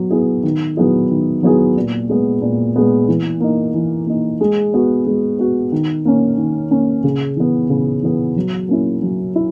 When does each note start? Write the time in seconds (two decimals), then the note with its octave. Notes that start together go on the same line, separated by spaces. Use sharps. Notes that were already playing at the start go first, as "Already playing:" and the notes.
Already playing: F#3 B3
0.10 B3 E4 G#4
0.43 D#3
0.77 F#3 B3 E4 G#4
1.10 D#3
1.43 F#3 B3 E4 G#4
1.76 A#2
2.09 G#3 B3
2.42 A#2
2.76 G#3 B3
3.08 E3
3.40 A#3 D#4
3.74 E3
4.07 A#3 D#4
4.41 G#3
4.74 B3 F#4
5.07 G#3
5.39 B3 F#4
5.72 D#3
6.05 A#3 C#4
6.38 D#3
6.71 A#3 C#4
7.04 C#3
7.36 E3 B3
7.69 C#3
8.02 E3 B3
8.37 F#3
8.69 A#3 C#4 E4
9.02 F#3
9.36 E4